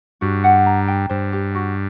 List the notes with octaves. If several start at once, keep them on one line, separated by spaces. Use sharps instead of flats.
G2 F#4
F#5
A#5
G5
G2 C5
G4
F#4